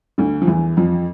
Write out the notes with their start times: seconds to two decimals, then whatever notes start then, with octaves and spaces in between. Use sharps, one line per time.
0.18 D2 D3
0.42 F3
0.47 E2 E3
0.77 F2 F3